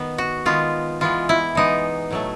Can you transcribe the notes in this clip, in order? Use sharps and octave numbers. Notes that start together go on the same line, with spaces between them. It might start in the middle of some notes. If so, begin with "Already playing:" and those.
Already playing: D#3 B3
F#4
D#3 G#3 B3 F4
E3 G#3 B3 F4
E4
E3 G#3 B3 D#4
A2 F#3 A3